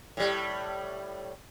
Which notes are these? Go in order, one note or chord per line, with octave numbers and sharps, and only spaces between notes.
A2 G3